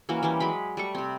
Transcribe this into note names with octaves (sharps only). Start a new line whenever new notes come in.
E3 A#3 C#4 F#4
E3 G3 C#4 C5
F#3 G#3 B5 D6
G3 A3 C#6
C3 C4